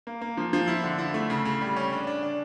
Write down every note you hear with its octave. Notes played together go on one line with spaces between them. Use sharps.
A#3
A#3
F3
F3
E4
D3
E4
A3
C#3
C#3
G3
C#4
D4
D4
D4